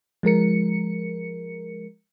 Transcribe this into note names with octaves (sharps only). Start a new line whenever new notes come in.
F3 G#3 A#4 C#7